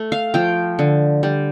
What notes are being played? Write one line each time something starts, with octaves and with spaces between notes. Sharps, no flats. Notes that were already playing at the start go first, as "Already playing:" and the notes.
Already playing: A3
F5
F3 G5
D3
G3